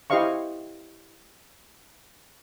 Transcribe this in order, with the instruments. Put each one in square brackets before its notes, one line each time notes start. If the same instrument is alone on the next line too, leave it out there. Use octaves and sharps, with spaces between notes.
[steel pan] E4 G4 C5 D#5 F5 C#6